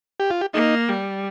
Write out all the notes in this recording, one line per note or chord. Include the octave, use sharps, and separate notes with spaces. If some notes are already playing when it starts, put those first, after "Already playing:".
G4
F4
G4
A#3 D#4
G3